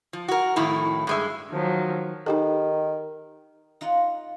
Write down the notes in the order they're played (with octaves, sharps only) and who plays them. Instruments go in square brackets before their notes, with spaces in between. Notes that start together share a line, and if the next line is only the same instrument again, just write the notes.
[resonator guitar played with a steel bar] F3
F#4 A#4
F2 A2 D#3 E4
G2 G#3 E5
[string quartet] D#3 F3 F#3
[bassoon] D#3 [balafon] D#4 G4 A4
[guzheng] D#4 F4 A#4 F#5